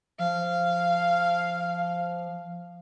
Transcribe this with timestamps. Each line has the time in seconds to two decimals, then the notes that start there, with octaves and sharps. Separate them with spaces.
0.19 F3 F5